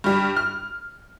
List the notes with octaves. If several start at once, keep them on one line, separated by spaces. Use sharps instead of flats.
G2 G3
F6